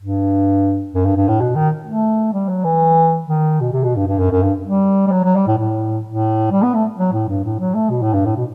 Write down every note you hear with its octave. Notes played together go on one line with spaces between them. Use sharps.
G2
F#2
G2
G2
A2
B2
D#3
A3
G3
F#3
E3
D#3
B2
C3
B2
G2
G2
F#2
F#2
G2
G3
G3
F#3
F#3
G3
A2
A2
A2
G3
B3
A3
F#3
A2
G2
A2
F#3
A3
B2
A2
G2
A2
B2